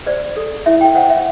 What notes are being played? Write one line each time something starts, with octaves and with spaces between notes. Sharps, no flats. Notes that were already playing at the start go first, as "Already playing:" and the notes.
C5 D5
A4
E4 E5
G5
C5 F#5
E5